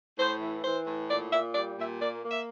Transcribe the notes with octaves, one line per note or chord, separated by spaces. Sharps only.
A2 C5
E3
E3 C5
A2
A#2 D5
A#2 E5
G3 D5
A#2 E5
A#3 D5
A#3
E5